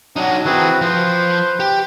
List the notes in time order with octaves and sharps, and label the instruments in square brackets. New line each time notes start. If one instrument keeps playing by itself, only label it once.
[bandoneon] F#3 D4 [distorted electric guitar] D#4 F#4
[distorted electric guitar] E3 A5 [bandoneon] C4 F#4 B4 [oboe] G#4
[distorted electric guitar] F3 [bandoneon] B4 [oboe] C5
[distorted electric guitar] G4